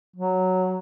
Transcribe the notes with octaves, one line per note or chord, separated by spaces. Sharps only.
F#3